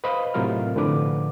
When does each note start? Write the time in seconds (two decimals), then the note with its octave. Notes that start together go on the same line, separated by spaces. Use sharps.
0.04 B4 C5 D#5 F5 B5
0.34 A2 C3 F#3 F4 A#4 F6
0.75 A2 D3 F3 B4 D6